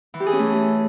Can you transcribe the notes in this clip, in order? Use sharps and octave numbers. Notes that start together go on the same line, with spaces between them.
E3
G4
G#4
C#4
A3